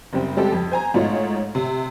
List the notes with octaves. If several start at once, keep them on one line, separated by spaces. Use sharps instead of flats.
F#1 G3 C4
G3 G#3 C4 G4 A4
F2
C5 G#5 A#5
G#2 A3 D#4 F4 C#5 D#5
C3